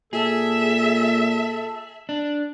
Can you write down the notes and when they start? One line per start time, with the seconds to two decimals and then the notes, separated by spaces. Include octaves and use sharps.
0.13 A#2 G#4 A4 E5
2.09 D4